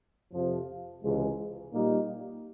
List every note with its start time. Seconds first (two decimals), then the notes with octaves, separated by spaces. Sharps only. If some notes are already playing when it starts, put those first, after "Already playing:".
0.33 F2 C3 F3
1.02 C#2 C3 E3 G#3
1.73 A#2 G3 A#3 D#4